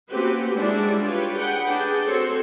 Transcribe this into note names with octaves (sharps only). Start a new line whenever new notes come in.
A#3 C4 C#4 F#4 G4 B4
G3 G#3 D4 E4 F#4
D4 F4 G4 B4 C#5
G#4 B4 F#5 G5
D4 G#4 G5
C4 F#4 A4 C#5 C6